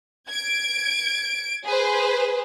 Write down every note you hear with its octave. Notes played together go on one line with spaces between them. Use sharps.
G#6 D7
G#4 B4 C5